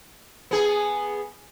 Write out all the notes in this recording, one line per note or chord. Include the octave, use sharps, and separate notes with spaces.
B3 G#4